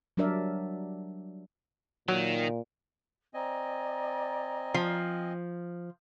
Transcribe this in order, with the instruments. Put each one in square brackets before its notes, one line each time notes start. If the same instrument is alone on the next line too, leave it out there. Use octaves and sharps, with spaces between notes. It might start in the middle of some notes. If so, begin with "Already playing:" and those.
[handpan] F#3 G3 D4 A#4 D5 E5
[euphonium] A#2 [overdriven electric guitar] D#3 [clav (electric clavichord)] F#3
[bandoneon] C4 D#5 G#5 [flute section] D5 A#5
[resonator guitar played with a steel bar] F3